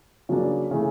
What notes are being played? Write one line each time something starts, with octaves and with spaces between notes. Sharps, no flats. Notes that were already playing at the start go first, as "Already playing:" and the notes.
C#3 F#3 A#3 D4
C#3 E3 A3